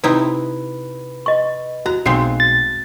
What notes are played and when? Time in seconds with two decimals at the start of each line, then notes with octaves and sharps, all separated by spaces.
0.04 C3 D#4 E4 B4
1.26 D#5 C#6
1.86 F#4 A#5 F#6
2.06 B1 G#3 A3 C4 C7
2.40 A6